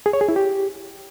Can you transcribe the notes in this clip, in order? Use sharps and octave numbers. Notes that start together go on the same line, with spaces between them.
G#4
C#5
G#4
E4
G4